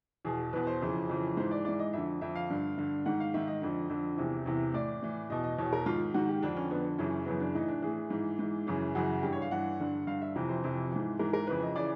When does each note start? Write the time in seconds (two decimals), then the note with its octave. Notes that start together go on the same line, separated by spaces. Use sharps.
0.25 E2 B2 G#4
0.53 E2 B2 B4
0.67 C5
0.82 F2 C#3 E3
1.09 F2 C#3 E3
1.37 G#2 E3 C5
1.51 D5
1.65 G#2 E3 D5
1.79 D#5
1.93 F2 D3 E5
2.21 F2 D3 E5
2.35 F5
2.50 G2 D3
2.78 G2 D3
3.06 G#2 D#3 F#5
3.20 F5
3.34 G#2 D#3 E5
3.48 D#5
3.62 F2 D3
3.89 F2 D3
4.17 E2 C3 E3
4.46 E2 C3 E3
4.74 A2 E3 D5
5.02 A2 E3
5.30 E2 B2 D#5
5.44 D#5
5.58 E2 B2 C#5
5.73 A#4
5.86 G#2 D#3 F4
6.14 G#2 D#3 F#4
6.29 G4
6.42 F2 D3 D4
6.57 C#4
6.71 F2 D3 B3
6.98 F#2 C#3 E3 C#4
7.26 F#2 C#3 E3 B3
7.40 D4
7.55 A2 E3 D#4
7.68 D4
7.82 A2 E3 G#4
8.10 G#2 E3
8.39 G#2 E3
8.67 F#2 C#3 E3
8.95 F#2 C#3 E3 F#4
9.23 G2 E3 G4
9.33 C#5
9.42 F5
9.51 G2 E3 F#5
9.80 G2 D3
10.07 G2 D3 F5
10.22 E5
10.36 F2 C3 E3
10.49 C5
10.64 F2 C3 E3
10.91 G#2 E3
11.19 G#2 E3 A#4
11.33 A#4
11.47 F2 C#3 E3 B4
11.62 D#5
11.76 C#3 E3 D5